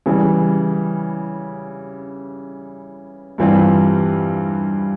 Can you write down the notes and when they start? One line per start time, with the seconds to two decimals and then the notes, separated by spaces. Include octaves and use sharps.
0.06 C#3 E3 G3
3.38 G2 E3 G3 C4 F4